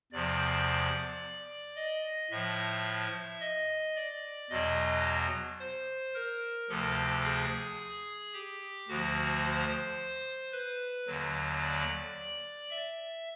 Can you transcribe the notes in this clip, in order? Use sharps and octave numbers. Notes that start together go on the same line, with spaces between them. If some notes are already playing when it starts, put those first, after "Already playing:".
E2 C3 F3 D5
D#5
A2 F3 E5
D#5
D5
E2 B2 F#3 D#5
C5
A#4
D2 C3 F3 A4
G#4
G4
D2 D3 F3 F#4
C5
B4
D#2 D3 F#3
D5
E5